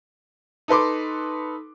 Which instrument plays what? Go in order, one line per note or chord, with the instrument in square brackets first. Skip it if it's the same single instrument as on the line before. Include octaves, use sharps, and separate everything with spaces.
[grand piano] D#4 A4 B4 C6 D6